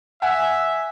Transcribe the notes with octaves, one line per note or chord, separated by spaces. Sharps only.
E5 F#5 G#5